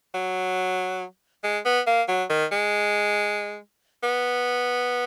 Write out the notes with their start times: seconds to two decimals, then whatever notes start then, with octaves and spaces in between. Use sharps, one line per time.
0.14 F#3
1.44 G#3
1.65 B3
1.87 A#3
2.08 F#3
2.30 D#3
2.52 G#3
4.03 B3